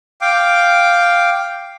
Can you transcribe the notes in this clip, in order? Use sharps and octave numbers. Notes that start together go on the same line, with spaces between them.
F5 G5 D6